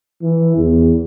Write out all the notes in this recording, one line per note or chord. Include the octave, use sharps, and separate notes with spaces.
E3
E2